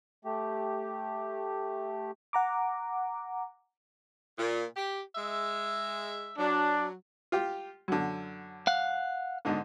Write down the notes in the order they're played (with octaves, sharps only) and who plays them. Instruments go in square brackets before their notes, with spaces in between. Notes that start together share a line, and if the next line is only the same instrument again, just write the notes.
[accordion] A3 G4
[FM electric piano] F#5 A#5 D6
[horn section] A#2
G4
G#3 E5
[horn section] F#3 [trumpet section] D4
[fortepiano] F4 G4
F#2 D3
[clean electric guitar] F5 F#5
[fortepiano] G#2 D3 D#4